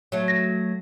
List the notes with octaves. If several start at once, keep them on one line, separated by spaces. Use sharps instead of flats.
F#3 A3
A#6